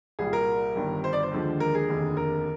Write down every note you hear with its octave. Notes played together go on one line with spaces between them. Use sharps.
C2 A#2 G3 G#4
A#4
G1 G2 D#3 G3
C5
D5
C5
D#2 D3 F3 G#3
A#4
G#4
F1 D#2 D3
A#4